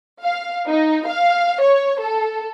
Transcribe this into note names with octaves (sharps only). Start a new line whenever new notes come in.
F5
D#4
F5
C#5
A4